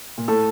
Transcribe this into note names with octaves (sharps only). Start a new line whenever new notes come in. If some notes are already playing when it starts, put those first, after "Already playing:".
A#2
A2 A4